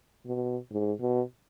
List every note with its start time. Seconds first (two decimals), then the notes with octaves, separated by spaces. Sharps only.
0.26 B2
0.71 G#2
1.00 B2